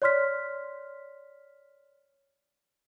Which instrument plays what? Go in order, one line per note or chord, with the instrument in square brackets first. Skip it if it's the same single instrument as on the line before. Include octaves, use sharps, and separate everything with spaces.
[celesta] C#5 D5 C6 F6 B6